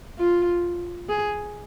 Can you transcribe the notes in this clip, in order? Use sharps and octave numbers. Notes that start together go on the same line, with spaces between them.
F4
G#4